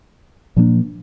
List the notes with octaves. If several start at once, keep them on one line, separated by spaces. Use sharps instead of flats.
A#2 F3 A#3 D4